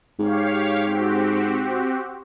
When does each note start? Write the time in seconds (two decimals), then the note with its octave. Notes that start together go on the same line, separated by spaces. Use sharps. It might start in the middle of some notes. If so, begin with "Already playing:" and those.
0.20 G#2 G4 C#5 F5
0.85 C4 F#4 G4